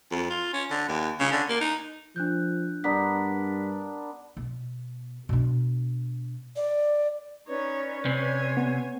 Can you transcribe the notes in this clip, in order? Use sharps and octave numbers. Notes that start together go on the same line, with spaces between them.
F2
F4
C#4
D3
D#2
C#3
D3
A#3
D#4
F3 D4 F#6 G6
G2 B3 D4 A#4 B6
B2
B2 D4
D5
C#4 D#4 B4 C#5 D5
C3 C#5 G#5
B3